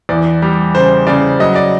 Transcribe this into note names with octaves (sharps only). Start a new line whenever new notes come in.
E2 D5
G3
C#3 C5
C#3 D5
F#3 D#5
D5